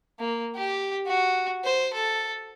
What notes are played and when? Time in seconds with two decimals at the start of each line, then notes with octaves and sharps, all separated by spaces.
0.19 A#3
0.56 G4
1.07 F#4
1.64 C5
1.93 A4